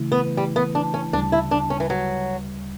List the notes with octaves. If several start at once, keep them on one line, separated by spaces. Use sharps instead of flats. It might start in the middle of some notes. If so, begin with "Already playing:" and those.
Already playing: C#3 E3 A3 E4
B3
G3
B3
D4
C#4
D2 C#3 G3 D4
E4
D4
C#4
E3
F#3